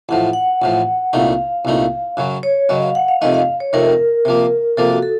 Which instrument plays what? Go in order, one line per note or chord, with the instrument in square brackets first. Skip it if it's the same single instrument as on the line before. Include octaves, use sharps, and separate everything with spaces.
[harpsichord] A1 A2 F3 [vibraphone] F#5
[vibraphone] F#5
[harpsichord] A1 A2 F3
[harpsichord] C2 A#2 A3 D#4 [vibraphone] F5
[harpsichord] C2 A#2 A3 D#4
F#2 C#3 F#3
[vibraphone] C#5
[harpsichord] F#2 C#3 F#3 [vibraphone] D#5
[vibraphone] F5
F#5
F5
[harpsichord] F2 C3 D#3 A3 [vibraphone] D#5
[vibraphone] F5
C#5
[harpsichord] F2 C3 D#3 A3 [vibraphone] A#4
[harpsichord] C3 F3 A#3
[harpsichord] C3 F3 A#3 [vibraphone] A4
[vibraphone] F#4
A4